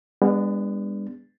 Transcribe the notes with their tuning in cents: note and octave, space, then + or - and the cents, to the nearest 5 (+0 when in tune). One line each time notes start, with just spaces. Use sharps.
G#3 -45 B3 +0 D4 +0